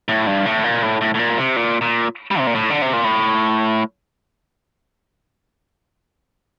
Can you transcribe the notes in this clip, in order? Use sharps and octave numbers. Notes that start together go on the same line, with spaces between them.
A2
G2
A2
A#2
A2
A2
A2
A#2
C3
A#2
A#2
G3
C3
A#2
A2
D3
C3
A#2
A2